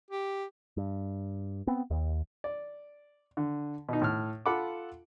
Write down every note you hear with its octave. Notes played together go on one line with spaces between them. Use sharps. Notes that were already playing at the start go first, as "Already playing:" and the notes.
G4
G2
B3 C4
D#2
D5
D3
B2 D#4
A2 F6
F4 A4 F#5 B5 D6